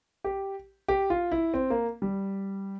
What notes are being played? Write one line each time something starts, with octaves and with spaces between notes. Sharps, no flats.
G4
G4
F4
E4
C4
A#3
G3